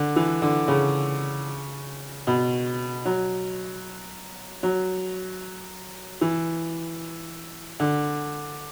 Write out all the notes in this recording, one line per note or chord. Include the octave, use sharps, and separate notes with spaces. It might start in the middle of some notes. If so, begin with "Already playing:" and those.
Already playing: D3
E3
D3
C#3
B2
F#3
F#3
E3
D3